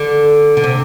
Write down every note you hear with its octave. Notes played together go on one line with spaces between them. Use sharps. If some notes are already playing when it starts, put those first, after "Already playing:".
Already playing: D3
D3
C3